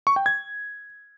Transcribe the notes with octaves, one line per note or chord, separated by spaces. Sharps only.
C#6
G5
G#6